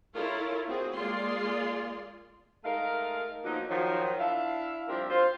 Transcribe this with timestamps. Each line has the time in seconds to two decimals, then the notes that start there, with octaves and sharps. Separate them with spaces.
0.14 E4 F4 A4 A#4 C#5
0.65 A3 C4 F#4 G#4
0.95 G#3 A#3 F4 G#4 D5 C6
2.64 G#3 A3 D#4 A#4 F5
3.44 F3 F#3 A#3 B3 D#4
3.69 D#3 F3 F#3
4.19 D4 E4 E5 F5
4.88 F3 G3 C4 D4 G4 A#4
5.10 F4 C5